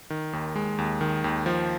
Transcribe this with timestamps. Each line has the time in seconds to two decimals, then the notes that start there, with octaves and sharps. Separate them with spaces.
0.10 D#3
0.33 D#2
0.56 G#3
0.78 D#2
1.01 D#3
1.24 D#2
1.46 F3